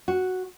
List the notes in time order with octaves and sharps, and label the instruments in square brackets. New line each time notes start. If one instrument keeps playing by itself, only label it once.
[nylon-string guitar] F#4